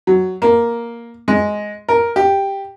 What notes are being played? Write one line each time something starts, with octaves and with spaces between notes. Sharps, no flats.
F#3
A#3
G#3
A#4
G4